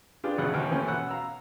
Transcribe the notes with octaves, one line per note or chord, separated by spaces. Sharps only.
D4 F4 G4 G#4 B4
A1 B2 G#4 F#5 F#6
D#2 E3 G5 F6
E3 F3 A3 A#3 C#4
B2 F#5 E6
F5 A#5 E6